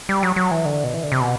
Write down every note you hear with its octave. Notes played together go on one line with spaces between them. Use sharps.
G3
F#3
F#3
E3
D3
B2
E3
D3
C3
B2